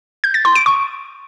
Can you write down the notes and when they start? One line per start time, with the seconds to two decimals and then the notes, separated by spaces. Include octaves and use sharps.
0.24 G6
0.34 A6
0.45 C6
0.55 D7
0.66 C#6